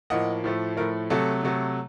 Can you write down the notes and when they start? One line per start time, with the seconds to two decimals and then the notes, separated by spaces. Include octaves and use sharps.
0.10 A2 F3 A#3 D#5 F#5
0.44 A2 F3 A3
0.77 A2 F3 A3 A#4
1.10 C3 F#3 A3 A4
1.43 C3 F#3 A3